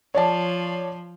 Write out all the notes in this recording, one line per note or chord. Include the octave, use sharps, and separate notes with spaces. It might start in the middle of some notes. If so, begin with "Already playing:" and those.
F3 C#5 D5 A5